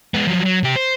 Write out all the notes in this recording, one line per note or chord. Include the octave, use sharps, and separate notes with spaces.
G#3 B3
F3 F#3
F#3
C3 G4
C5